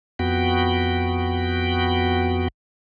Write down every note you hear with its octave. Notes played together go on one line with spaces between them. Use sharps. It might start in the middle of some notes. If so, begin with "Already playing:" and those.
F2 B3 F#4 G5